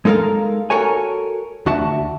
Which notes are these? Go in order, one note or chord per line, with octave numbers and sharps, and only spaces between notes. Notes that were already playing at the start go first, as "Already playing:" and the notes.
G#3 D#4 A4 A#4 F5
F#4 A4 A#4 C#5 G#5
D2 D4 F#4 D5 E5 A5